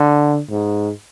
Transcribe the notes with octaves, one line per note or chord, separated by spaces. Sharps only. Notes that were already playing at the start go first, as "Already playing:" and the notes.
Already playing: D3
G#2